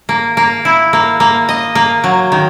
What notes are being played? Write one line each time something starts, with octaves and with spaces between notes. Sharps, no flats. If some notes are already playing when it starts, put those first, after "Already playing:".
A#3
A#3
E4
A#3
A#3
D#5
A#3
F#3
D#3